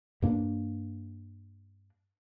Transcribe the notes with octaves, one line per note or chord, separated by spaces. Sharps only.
G2 A#3 D4